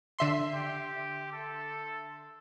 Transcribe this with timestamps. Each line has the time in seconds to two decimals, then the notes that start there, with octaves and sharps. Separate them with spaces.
0.19 D3 E5 C6
0.54 G4
1.32 A4